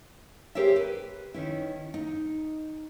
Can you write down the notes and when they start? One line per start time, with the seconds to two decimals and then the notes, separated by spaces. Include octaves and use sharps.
0.55 G4 G#4 A#4 C5 C#5 E5
0.76 B4
1.34 D#3 C#4 E4
1.94 D#4